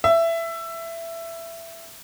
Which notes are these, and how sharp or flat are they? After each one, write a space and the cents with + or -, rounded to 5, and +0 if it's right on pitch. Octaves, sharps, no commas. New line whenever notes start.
E5 +15